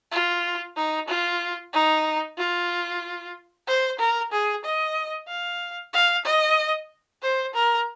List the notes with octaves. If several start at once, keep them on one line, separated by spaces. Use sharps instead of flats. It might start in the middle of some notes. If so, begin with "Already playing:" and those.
F4
D#4
F4
D#4
F4
C5
A#4
G#4
D#5
F5
F5
D#5
C5
A#4